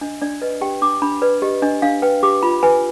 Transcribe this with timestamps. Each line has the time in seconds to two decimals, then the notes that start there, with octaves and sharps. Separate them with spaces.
0.01 D4 D#5
0.22 D4 D5
0.42 B4 D#5
0.61 G4 G5
0.82 D4 D6
1.02 D4 B5
1.22 B4 D5
1.42 G4 D#5
1.62 D4 D#5
1.82 D4 F5
2.02 B4 G5
2.23 G4 D6
2.43 F4 B5
2.63 B4 G#5